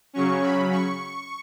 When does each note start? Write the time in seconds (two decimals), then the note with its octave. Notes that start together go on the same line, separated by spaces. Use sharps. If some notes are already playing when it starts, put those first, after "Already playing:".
0.13 C#3 F#3 C#4 C#6
0.43 B5
0.71 C#6